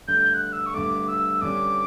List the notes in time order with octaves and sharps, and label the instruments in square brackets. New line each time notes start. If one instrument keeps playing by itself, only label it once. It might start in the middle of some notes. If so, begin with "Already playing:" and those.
[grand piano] G2 D3 A3 [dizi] G6
[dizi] G6
F#6
E6
C#6
[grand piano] G2 D3 A3 [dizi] D6
[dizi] E6
[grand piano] G2 D3 G3 C#4 [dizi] D6